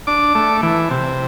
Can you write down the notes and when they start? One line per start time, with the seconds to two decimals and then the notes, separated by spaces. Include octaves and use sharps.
0.07 D4 D6
0.35 A3
0.63 E3
0.91 C3